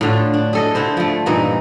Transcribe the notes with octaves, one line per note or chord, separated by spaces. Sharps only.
A2 D3 F4
D4
G#4 A4 D#5
D3 E4 C5
F3 A3
G2 A#2 E3 D#4